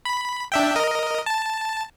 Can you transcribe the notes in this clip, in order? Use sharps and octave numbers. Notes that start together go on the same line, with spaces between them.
B5
D4 E5 G5
A#4 D#5
A5